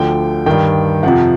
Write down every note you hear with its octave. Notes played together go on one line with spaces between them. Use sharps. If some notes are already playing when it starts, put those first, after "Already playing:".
Already playing: D2 D3 F3 G5
G2 D#3 G5
F2 C3 F3 F#5